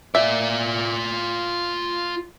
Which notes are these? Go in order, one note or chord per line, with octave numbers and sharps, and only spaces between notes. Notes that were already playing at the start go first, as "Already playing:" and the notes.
F4 D5 E5